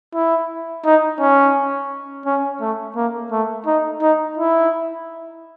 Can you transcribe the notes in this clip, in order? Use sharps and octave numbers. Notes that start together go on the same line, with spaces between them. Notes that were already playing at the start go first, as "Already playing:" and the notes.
E4
D#4
C#4
C#4
A3
A#3
A3
D#4
D#4
E4